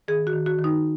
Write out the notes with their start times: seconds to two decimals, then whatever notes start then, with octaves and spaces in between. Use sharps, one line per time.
0.08 D#3 G#4
0.27 F#4
0.33 D#3
0.46 F#4
0.59 D#3
0.64 D#4